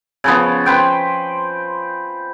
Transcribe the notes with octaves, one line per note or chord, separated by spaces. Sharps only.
C#3 F3 B3
B4 C5 G5